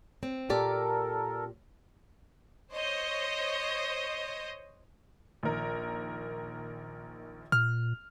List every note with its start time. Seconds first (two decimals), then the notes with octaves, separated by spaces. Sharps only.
0.23 C4
0.50 A#2 G4 A4 A#4 D5
2.74 C5 C#5 D#5
5.43 A#1 D#3 A#4
7.52 A#2 F6